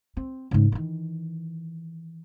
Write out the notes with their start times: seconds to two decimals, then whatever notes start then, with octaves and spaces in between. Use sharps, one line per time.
0.17 C4
0.51 G#2 C#3
0.72 D#3 E3